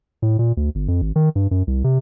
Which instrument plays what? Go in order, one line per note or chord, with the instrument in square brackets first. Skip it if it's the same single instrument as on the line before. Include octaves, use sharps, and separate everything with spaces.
[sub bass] A2
A#2
D2
G1
F2
G#1
D#3
G2
F#2
C2
C3